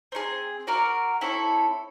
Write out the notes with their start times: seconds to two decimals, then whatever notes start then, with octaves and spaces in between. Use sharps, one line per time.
0.12 C4 D#4 G#4
0.67 F#4 A#4 D5 F5
1.21 C4 E4 A4 C#5